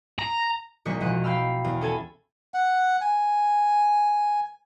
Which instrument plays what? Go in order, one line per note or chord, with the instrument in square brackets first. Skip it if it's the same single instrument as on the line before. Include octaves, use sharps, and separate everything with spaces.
[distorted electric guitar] A#5
[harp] E1 B1 G#3 F#4 C#6 B6
E2 B2 F3 F#6 D#7
F5 G5 B5 E6 F6
E2
C#4 A4 G#5 B5
[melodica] F#5
G#5